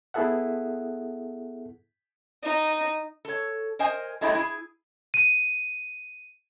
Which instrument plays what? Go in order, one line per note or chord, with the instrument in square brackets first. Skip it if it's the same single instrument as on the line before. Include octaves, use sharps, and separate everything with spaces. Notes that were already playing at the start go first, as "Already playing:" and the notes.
[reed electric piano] B3 E4 G#4 A4 E5 F#5
[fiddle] D#4
[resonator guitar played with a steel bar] A4 C#5
A#4 C5 D#5 G#5
F#3 G#3 A3 D#4 E4 G4
E4 G#4
[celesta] D#7